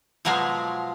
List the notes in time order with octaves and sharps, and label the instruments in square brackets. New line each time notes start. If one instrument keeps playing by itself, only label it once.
[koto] B2 F3 F#3 G#3 F5